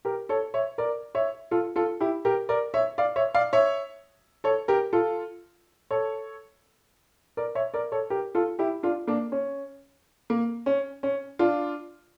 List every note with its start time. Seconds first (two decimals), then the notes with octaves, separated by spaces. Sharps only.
0.05 G4 A#4
0.29 A4 C#5
0.54 C#5 E5
0.78 A#4 D5
1.15 C#5 E5
1.51 F4 A4
1.76 F4 A4
2.00 E4 G4
2.25 G4 A#4
2.49 A#4 D5
2.74 C#5 E5
2.98 D5 F5
3.16 C#5 E5
3.34 D5 F5
3.53 C#5 E5
4.44 A4 C#5
4.68 G4 A#4
4.93 F4 A4
5.91 A4 C#5
7.37 A#4 D5
7.55 C#5 E5
7.74 A#4 D5
7.92 A4 C#5
8.10 G4 A#4
8.35 F4 A4
8.59 E4 G4
8.83 D4 F4
9.07 A#3 D4
9.32 C#4
10.30 A#3
10.66 C#4
11.03 C#4
11.39 D4 F4